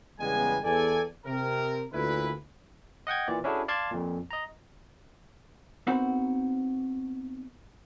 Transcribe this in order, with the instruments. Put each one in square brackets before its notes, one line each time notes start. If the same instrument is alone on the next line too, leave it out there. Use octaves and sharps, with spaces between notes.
[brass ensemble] E2 C#3 G3 G#3 B3 G#5
E2 A4 D5 G#5
C3 A#4
D2 A#2 E4 B4
[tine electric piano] D#5 F#5 G5 G#6
A#2 E3 D5
C#4 D4 E4 F#4 G#4 A4
D5 F5 A5 C6 G#6
F2 A#2
D#5 A#5
[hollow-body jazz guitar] B3 C4 D#4 F#4 A#4 C5